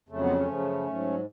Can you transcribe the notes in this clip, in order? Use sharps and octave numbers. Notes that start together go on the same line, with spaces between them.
F2 C#3 F#3 A3
G#3 B3
A3 C#4
F#2 C#3 F3
G#2 F#3